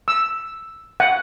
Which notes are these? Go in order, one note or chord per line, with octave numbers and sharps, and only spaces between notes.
E6
F#5